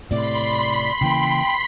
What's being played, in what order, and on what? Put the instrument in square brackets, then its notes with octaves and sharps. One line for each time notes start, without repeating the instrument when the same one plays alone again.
[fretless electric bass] A2 C3 [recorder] D5 [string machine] B5 C6 B6
[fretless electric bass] C#3 E3 A#3 [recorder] G5